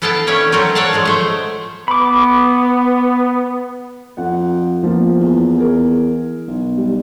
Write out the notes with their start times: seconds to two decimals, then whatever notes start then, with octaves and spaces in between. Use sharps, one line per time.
0.02 B3 E4 A4 F5 G5 A5
0.27 E3 A3 C#4 C#5 D5 E5
0.52 F#3 C4 A4 A#4 C5 C#5
0.75 A4 C#5 D5 F5 F#5 A5
0.93 F3 F#3 G#3
1.05 A3 C5 C#5
1.88 B3 B5 D6
4.17 F2 F#5
4.83 F3 A#3 B3
5.20 E2
5.58 G#4 A#4
6.48 B1
6.78 G3